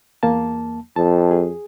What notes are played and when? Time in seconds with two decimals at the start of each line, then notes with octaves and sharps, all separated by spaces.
0.23 E2 A#3 A5
0.96 F2 A5
1.31 G#4